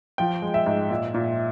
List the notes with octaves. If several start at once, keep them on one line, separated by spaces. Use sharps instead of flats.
F3 G5
G#3
E5
G#2
A#2
A#2